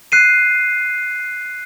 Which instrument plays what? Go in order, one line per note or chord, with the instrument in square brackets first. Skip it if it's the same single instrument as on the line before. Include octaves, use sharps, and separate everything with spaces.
[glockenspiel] F#6 C7 D#7